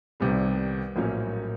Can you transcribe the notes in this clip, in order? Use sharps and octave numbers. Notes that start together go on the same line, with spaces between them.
C2 C3 D#3 G3 B3
A#1 A2 F#3 A#3 C#4